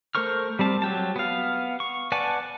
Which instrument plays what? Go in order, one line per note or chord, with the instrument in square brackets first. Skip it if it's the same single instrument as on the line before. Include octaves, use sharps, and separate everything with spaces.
[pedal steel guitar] A3 A#4 C5 C#6 F6
G3 C4 A5
F#3 G4 A5
B3 F5
C#6
B4 D5 F#5 G#5 A5